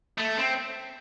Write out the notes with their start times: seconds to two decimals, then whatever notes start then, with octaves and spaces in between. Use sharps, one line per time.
0.18 A3
0.38 C4